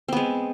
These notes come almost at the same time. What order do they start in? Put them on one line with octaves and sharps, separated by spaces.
C4 B3 G#3